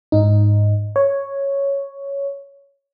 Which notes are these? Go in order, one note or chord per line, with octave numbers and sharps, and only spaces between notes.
G#2 D#4
C#5